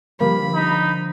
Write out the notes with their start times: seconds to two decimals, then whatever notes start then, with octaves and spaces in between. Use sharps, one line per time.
0.20 D3 F3 G3 A#3 B5
0.54 D#4